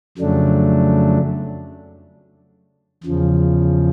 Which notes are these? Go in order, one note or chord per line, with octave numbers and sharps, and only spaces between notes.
F2 C#3 F#3 A3 D4
E2 C#3 F3